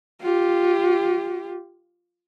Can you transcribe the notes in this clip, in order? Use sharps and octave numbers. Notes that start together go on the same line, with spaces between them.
F4 G4